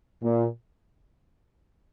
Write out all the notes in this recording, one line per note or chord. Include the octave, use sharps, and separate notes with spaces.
A#2